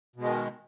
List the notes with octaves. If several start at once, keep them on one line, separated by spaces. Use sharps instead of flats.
B2 D#3 G#3